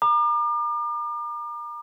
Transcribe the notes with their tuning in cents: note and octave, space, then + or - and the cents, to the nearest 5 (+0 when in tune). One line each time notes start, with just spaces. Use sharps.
A#5 +20 D6 +40